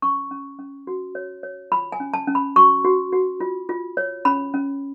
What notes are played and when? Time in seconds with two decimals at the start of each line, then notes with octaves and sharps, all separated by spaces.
0.02 C#4 C#6
0.31 C#4
0.59 C#4
0.87 F#4
1.15 C#5
1.43 C#5
1.72 F4 B5
1.92 G#5
2.00 C#4
2.14 A5
2.27 C#4
2.35 B5
2.56 F#4 C#6
2.84 F#4
3.12 F#4
3.40 F4
3.69 F4
3.97 C#5
4.25 C#4 B5
4.54 C#4